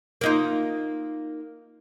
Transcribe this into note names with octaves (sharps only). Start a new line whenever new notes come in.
A#3 D#4 F4